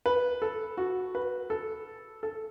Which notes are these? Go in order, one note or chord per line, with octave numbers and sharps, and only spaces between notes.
B4
A4
F#4
B4
A4
A4